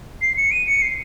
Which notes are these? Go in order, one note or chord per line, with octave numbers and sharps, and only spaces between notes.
C7
C#7
D#7
C#7
C7